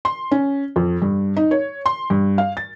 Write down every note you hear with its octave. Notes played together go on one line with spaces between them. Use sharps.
C6
C#4
F2
G2
D#4
C#5
C6
G2
F5
A6